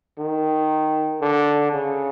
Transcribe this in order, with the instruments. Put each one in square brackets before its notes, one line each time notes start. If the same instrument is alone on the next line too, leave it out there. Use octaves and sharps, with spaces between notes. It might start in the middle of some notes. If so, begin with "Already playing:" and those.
[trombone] D#3
D3
C#3